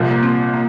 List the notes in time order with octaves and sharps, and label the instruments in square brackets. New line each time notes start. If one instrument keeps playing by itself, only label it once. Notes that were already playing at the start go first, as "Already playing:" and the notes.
Already playing: [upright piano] C2 A#2 F3
[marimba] A#3
C4
A#3